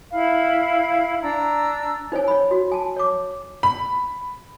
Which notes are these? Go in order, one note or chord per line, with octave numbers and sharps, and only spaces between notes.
E4 F5 B5
D4 A#5 E6
D#4 C5 C#5 G#5
C#5 B5
F#4
G#5 A5
C#5 D6
B5